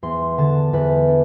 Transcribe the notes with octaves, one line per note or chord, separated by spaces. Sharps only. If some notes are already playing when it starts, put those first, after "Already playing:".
E2 C6
D3 A5
E2 B4
D4